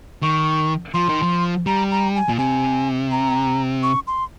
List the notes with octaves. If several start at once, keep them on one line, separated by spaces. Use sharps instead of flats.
D#3 C#6
F3 C6
D#3
F3
G3 A#5
A#5
G#5
A#2
C3 G#5
A#5
C#6
C6